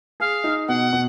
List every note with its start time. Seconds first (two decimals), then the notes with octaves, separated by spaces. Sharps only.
0.20 G#4 F5
0.44 D#4
0.68 B2 F#5
0.93 B2